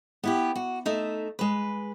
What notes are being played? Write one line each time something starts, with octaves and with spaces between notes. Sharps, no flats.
B3 E4 G4
F#4
A3 D#4 E5
G#3 B4